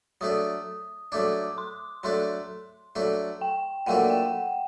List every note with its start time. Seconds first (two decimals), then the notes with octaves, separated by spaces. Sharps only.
0.21 F#3 A3 D4 D#6
1.12 F#3 A3 D4 D6
1.58 C6
2.04 F#3 A3 D4 C6
2.95 F#3 A3 D4
3.41 G5
3.87 A#2 F#3 A3 D4 F#5
4.10 G5